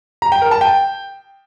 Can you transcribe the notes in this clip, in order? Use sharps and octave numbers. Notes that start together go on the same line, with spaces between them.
A#5
G5
A#4
A5
G5